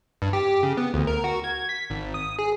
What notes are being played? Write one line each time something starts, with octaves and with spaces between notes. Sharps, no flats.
G2
G4
C#3
B3
D2
A#4
F#4
G#6
B6
G#1
D#6
G#4